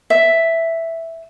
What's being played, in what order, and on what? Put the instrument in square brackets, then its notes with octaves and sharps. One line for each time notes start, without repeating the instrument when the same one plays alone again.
[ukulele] E5